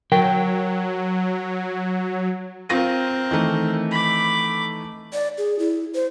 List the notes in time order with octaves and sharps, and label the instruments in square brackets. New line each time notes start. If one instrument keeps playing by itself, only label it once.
[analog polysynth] F#3 [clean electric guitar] A#4 G5
[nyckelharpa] C4 A#4 [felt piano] F4 A#6 D#7
[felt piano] D#3 E3 A3
[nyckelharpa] B5 D6
[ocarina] D5
G#4
E4
C5